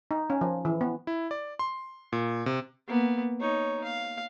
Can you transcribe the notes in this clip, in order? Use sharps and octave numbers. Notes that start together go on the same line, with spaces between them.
D#4
C#4
F3
E3
B3
E4
D5
C6
A#2
C3
A#3 B3
D#4 C#5
F5